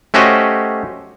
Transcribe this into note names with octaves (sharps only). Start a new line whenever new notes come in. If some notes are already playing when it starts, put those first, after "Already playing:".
A3 C#4 F#4 G4 C5 D#5